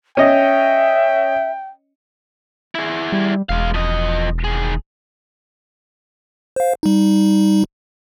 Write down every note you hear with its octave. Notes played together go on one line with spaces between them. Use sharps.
C#4 D#5 E5 G5
E4 G#4
G3
E1 G#3 F5
F3 D#5
D#3 G#4
C5 F5
G3 D#4